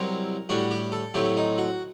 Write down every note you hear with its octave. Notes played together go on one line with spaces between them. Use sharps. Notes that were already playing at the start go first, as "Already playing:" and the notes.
Already playing: C2 C3 F#3 C4 A#4
A2 G3 D4 F#4
G4
A4
A2 F#3 A3 C4 G4
D#4
F#4